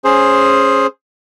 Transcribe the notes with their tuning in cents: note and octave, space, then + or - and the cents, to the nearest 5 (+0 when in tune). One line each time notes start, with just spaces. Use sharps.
C#4 +0 G#4 +0 C5 +10